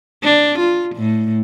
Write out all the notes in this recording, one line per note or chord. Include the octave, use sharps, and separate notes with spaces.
D4
F4
A2